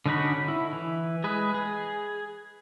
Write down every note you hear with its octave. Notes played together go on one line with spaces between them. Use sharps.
D3 C#4 D#4 F#4 B5
E4
E3
G#3 G#4 B4
G#4